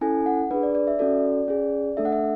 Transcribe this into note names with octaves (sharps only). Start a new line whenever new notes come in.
C#4 E4 A4 G#5
F#5
D4 G#4 B4
D5
D5
E5
C#4 F#4 A4 D5
C#4 G#4
A3 D4 A4 E5
F#5
E5